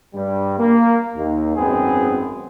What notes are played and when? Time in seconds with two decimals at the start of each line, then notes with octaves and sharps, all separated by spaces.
0.14 G2 G3
0.58 A#3
1.16 D#2
1.56 G#1 F#2 B3 C4 G#4